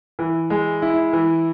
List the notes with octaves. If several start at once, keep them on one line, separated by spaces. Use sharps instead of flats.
E3
G#3
E4
E3